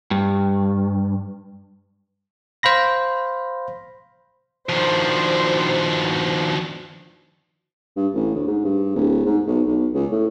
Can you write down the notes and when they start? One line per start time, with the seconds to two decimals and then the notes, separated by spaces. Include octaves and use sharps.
0.11 G2
2.63 C5 F5 B5 A#6
4.69 B2 D#3 F3 D4 C5
7.96 G2
8.14 A1
8.35 D2
8.47 G#2
8.64 G2
8.95 D1
9.25 G#2
9.47 B1
9.67 B1
9.94 C#2
10.12 A2